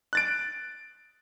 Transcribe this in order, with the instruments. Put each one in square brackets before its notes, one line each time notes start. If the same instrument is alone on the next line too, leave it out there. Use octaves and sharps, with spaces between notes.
[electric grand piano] F#6 A6 D7